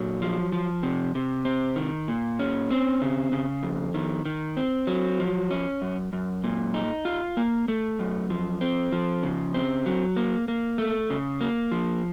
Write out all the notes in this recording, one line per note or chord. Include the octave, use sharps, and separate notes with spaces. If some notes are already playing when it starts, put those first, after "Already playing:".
Already playing: A#2 F#3
F3
F3
C3
C3
C4
D#3
A#2
C#4
C4
C#3
C#3
F2
D#3
D#3
C4
F#3
F3
C#4
F#2
F#2
A#2
D#4
F4
A#3
A3
F#2
F3
C4
F3
C#3
C4
F#3
A#3
A#3
A3
C#3
A#3
F3